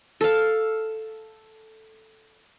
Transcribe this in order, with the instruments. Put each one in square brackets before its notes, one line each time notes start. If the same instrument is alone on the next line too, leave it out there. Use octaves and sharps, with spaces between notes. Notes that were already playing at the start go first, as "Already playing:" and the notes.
[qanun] A4 F5